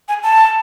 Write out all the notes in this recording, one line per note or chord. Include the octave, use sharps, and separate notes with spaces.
G#5
A5